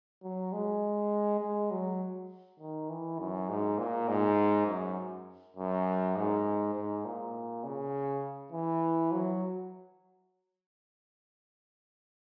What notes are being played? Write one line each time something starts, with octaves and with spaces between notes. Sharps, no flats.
F#3
G#3
G#3
F#3
D#3
E3
F#2
G#2
A#2
G#2
F#2
F#2
G#2
G#2
A#2
C#3
E3
F#3